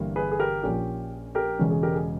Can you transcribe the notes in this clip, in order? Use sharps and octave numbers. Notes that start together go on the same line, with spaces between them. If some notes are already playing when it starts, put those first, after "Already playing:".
Already playing: G1 G2 E3 G3 A#3
G#4 B4
G#4
G4 A#4
A#1 A#2 A#3 C#4 G4
G4 A#4
E1 E2 C#3 G#3 C#4
G#4
G4 A#4
G#4